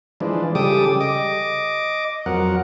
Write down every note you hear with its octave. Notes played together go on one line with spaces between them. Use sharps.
E3 F3 G#3 D4
C#3 G3 G4 A4 D6 D#6
D#5 D6
F2 F#3 A#4 F#5